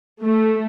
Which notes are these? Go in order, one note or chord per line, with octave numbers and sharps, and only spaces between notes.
A3